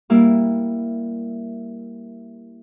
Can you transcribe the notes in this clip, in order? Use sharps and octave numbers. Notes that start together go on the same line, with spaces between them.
G3 A#3 E4